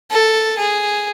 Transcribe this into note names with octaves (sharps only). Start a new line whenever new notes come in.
A4
G#4